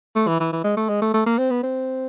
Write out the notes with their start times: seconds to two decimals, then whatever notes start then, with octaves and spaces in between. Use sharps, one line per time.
0.15 A3
0.27 E3
0.40 E3
0.52 E3
0.64 G#3
0.77 A3
0.89 G#3
1.02 A3
1.14 A3
1.26 A#3
1.38 C4
1.50 B3
1.63 C4